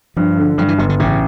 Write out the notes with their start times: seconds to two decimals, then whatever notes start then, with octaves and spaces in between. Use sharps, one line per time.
0.17 G2 F3
0.37 D3
0.58 G2 F3
0.68 E3
0.78 G1 D3
0.89 D3
1.00 A1 C#3